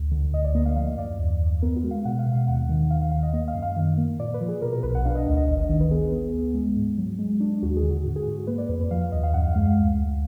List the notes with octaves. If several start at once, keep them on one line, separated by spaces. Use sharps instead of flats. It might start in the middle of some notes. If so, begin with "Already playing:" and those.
Already playing: D2
D3
D2 D#5
D5
A#3 D#5
F5
F3 F5
F5
F#2 D5
D#2
D#2
B3 A#4
F#4
G#3
F5
B2 F#5
F5
B2
F5
D#2 F#5
D#3
D#2 F5
F5
D#2 F5
D#5
A#3 D#5
F5
F#2
F5
D#3
A#3
A#2 D5
B4
F3
G#4
B2 A#4
A#4
B1 B4
F#5
D4 F5
D#5
D2 D#5
D#5
G#1 D#5
D#5
D#3 D#5
B4
B3 G#4
B3
D2
G#3
G#2
F#3
G#3
D4
D#2 F#4
G#4
D3
F#4
G#2 F#4
G#4
G#2 F#4
A#3 B4
D5
F2 B4
B4
F3 F5
F5
D#2 D#5
F5
F#2 F#5
F5
G#3 F5
F5
D2
D2